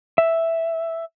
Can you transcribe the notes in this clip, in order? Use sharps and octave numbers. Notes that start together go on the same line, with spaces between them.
E5